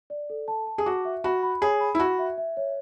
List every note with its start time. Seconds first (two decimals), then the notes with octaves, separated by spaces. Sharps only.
0.10 D5
0.30 A4
0.48 A5
0.67 A5
0.78 G#4
0.86 F#4 D6
1.05 E5
1.24 F#4 B5
1.43 B5
1.62 G#4 C#5
1.80 B5
1.95 E4
2.00 F#4 B5
2.19 E5
2.37 E5
2.57 C#5